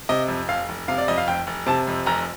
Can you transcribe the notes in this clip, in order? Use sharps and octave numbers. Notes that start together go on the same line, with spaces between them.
C3 D#5
F2
F1 F5
F1
C3 F5
D5
F2 D#5
F5
F1 G5
F1
C3 A5
F2
F1 A#5